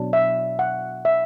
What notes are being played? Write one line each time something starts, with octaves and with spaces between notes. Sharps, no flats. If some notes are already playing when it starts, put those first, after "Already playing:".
Already playing: B2 F#3 D4
E5
F#5
E5